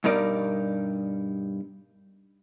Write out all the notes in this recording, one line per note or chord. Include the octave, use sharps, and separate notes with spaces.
G2 B2 D#4 A#4 D5